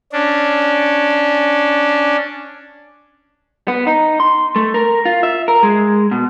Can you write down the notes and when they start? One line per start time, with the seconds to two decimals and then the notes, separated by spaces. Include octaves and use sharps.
0.13 C#4 D4
3.68 B3
3.87 D#4
4.20 C6
4.56 A3
4.74 A#4
5.05 F4
5.23 E5
5.48 A#4
5.63 G#3
6.11 B2